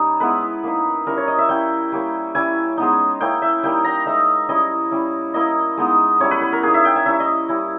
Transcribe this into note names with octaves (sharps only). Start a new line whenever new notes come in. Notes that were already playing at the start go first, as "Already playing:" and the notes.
Already playing: G3 C#4 D#4
G#3 B3 E4 B4
A#3 D#4
G3 C#4 E4 A#4
C#5
D#5
E5
G3 C#4 E4 G5
G3 A#3 C#4
G3 C#4 E4 G#5
G#3 B3 D#4
A#3 C#4 E4 G5
E5
G3 A#3 D#4 G5
A#5
G#3 D#4 E5
G3 C#4 E4 D#5
G3 C#4 E4
A#3 E4 D#5
G#3 B3 D#4
G3 C#4 E4 C#5
B4
B4
A#4
A#3 D#4 G#4
E5
G5
G#5
G3 C#4 E4 E5
D#5
G3 C#4 E4